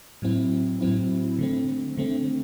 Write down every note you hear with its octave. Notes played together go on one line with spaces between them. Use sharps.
A2 F#3 C4 E4
A2 F#3 C4 E4
D3 A3 C4
D3 A3 C4